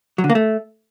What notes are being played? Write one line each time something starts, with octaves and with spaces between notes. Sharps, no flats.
F#3
D3
A#3
A3